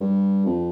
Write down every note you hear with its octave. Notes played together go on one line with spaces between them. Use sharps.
G2
F2